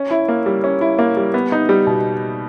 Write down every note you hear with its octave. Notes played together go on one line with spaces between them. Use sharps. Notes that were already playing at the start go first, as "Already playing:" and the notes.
Already playing: C#4
E4
A#3
G3
C#4
E4
A#3
G3
B3
D#4
G3
B2